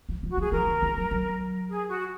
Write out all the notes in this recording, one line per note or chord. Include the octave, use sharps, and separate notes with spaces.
F3
F3
F#4
F#3
G#4
F3 A#4
D#3
F3
F#3
F#3
G#4
F#4